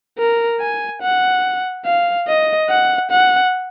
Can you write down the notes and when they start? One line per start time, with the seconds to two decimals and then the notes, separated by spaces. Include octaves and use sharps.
0.19 A#4
0.61 G#5
1.02 F#5
1.85 F5
2.28 D#5
2.70 F#5
3.11 F#5